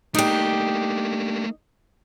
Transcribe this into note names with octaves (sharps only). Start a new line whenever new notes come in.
A3 A#3 D4 D#4 G4